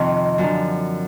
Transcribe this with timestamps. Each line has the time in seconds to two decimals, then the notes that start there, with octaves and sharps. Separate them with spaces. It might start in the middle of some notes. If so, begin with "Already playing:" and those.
Already playing: F2 C3 D#3 C4
0.38 F#2 D3 F3